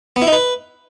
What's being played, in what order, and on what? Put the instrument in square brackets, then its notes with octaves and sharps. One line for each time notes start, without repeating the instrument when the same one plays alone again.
[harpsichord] B3
E4
D#4
B4